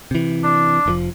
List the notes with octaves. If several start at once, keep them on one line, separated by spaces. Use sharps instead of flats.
C3 E3
D4
F1 G#2 F3